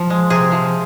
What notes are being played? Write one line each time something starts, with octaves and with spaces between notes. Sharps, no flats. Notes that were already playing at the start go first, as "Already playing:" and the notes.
Already playing: F3
G#3
C3 G#4
F3